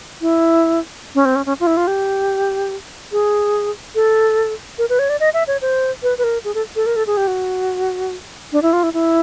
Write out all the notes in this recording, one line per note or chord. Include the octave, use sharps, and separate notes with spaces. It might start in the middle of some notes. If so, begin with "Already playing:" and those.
E4
C#4
C4
C#4
C#4
F4
E4
F4
G4
G#4
A4
A#4
B4
C#5
D5
D#5
E5
C#5
C5
B4
B4
A#4
G#4
A4
A4
A#4
A4
G#4
G4
F#4
D4
E4
F4
E4
E4